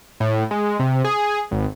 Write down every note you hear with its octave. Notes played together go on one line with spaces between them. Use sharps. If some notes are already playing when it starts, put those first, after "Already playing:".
A2
G#3
C3
G#4
G#1